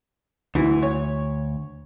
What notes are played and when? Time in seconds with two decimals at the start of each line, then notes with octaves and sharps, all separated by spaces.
0.55 D2 E3
0.82 C#5